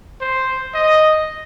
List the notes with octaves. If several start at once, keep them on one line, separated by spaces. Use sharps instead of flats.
C5
D#5